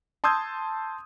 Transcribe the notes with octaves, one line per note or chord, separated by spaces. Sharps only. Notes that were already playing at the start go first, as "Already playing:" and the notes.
A5 C6 D#6 E6 G6 G#6